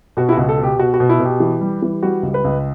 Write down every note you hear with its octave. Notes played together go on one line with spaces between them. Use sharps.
B2 F#4
E4
C#2 F#4
A4
B2
G4
B2 F#4
F#4
B2
E4
B2
G4
E3
G3
E3
G3 F#4
C#2
B4
C#2